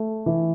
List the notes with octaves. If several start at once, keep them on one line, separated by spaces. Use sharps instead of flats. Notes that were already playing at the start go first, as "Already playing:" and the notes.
Already playing: A3
E3